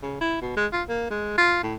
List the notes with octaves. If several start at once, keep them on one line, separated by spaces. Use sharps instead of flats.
C#3
E4
B2
G#3
F4
A#3
G#3
F4
A2